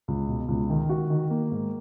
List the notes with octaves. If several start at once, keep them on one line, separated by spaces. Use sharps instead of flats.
C#2
B2
C#2
D#3
F#4
D#3
A#3
G#2